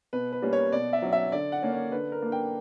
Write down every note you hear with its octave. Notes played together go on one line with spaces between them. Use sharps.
B2 B4
B4
G3 A#3 C#4
C#5
B2 D5
E5
F#3 C#4
E5
D3 D5
F#5
A#3 C#4
C#5
D3 B4
A#4
A#3 D4
G5